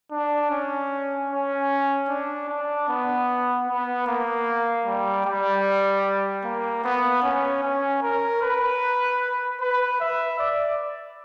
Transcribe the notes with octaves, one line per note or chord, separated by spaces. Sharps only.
D4
C#4
C#4
D4
D4
B3
B3
A#3
G3
G3
A#3
B3
C#4
C#4
A#4
B4
B4
E5
D5